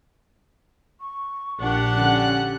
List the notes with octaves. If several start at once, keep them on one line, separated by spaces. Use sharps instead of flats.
C#6
A#1 D4 G4 F#5
D3 C#4 F#6